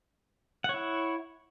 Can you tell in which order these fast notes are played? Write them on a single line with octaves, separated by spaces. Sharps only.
F#5 C#5 E4